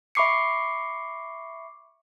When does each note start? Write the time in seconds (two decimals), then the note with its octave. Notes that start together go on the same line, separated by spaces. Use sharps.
0.15 E5 B5 C#6 D6 C7 C#7